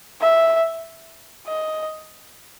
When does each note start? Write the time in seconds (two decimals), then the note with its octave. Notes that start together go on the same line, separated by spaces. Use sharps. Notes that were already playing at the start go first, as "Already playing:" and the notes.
0.20 E5
1.47 D#5